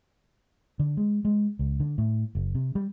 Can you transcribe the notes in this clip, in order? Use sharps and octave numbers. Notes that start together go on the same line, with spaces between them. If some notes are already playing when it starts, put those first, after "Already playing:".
D3
G#3
G#3
C#2
D3
A2
F#1
C3
G3